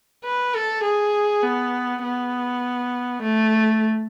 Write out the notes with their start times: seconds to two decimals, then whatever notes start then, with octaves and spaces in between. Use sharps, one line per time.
0.24 B4
0.54 A4
0.84 G#4
1.43 B3
2.03 B3
3.23 A3